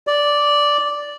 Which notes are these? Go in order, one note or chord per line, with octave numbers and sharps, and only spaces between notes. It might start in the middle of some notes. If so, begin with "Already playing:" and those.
D5